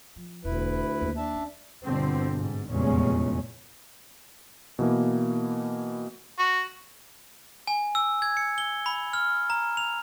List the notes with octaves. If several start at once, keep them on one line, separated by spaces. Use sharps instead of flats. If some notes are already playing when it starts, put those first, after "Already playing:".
F3
E1 D2 E4 B4
D#2
D4 E5 A5
C#4
G1 B2 D3 C4
G#2
F1 E2 A#2 C#3 G#3 C#4
B2 E3 A#3
F#4
G#5
E6
G#6
C#7
G7
B5
F6
A#5
F7